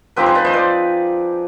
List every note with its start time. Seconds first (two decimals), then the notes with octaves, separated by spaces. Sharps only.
0.16 F3 C4 D#4 G4 B4
0.26 G#4 C5
0.35 B4 D5
0.45 C5 D#5
0.53 B4 D5